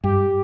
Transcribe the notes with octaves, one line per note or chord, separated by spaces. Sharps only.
G2 G4